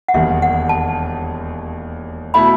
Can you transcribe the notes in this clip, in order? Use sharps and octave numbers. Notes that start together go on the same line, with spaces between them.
F#5
E1 D#2 D#3 G3 E5
F#5
A5
B2 A3 E4 B5